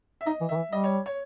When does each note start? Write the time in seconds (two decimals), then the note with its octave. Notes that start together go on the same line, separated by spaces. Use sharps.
0.21 E5
0.26 D#4 D#5
0.41 E3
0.49 D#3 E5
0.56 E3
0.72 G3 D#5
0.84 C#5
1.06 C#5